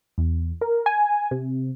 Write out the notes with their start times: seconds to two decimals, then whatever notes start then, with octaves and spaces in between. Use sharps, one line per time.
0.18 E2
0.61 A#4
0.86 G#5
1.31 C3